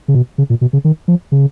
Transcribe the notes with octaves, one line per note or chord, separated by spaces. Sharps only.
C#3
B2
C#3
A#2
B2
C#3
D#3
F3
C#3